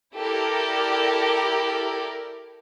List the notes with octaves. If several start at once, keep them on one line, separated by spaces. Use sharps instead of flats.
E4 G4 A4 A#4 D5